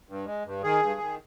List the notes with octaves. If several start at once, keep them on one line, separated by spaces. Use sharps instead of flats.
G2
G#3
G2
D#3 G#4
G2
D#3